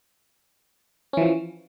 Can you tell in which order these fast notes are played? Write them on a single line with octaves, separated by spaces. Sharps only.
C#4 E3 F3